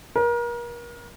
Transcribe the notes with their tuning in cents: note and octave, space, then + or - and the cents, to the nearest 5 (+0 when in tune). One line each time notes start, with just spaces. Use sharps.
A#4 +35